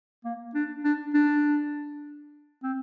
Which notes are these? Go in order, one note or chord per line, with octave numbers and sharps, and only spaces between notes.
A#3
D4
D4
D4
C4